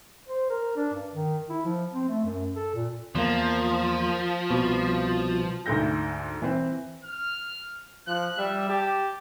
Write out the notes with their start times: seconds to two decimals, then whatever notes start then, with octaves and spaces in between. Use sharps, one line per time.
0.28 C5
0.50 A#4
0.76 D4
0.94 G2
1.14 D#3
1.50 E4
1.65 F3
1.93 C4
2.09 A3
2.25 F#2
2.56 A4
2.75 A#2
3.15 E2 F3 A#3
4.51 C2 B2
5.66 D2 G#2 A4 G6 A#6
6.42 E3 C4
7.04 F6
8.08 F3 F#6
8.38 G3 E5
8.69 G4 A5